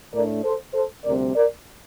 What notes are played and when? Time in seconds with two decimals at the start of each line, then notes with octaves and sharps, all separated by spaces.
0.14 A2 A3 D4 A#4 D5
0.44 A4 C5
0.74 A4 C5
1.04 D2 C3 G3 C4 A#4 D5
1.35 A#4 D5